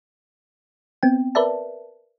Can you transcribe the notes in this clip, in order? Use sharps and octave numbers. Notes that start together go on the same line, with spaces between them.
B3 C4 G5
A#4 B4 D5 E5 A5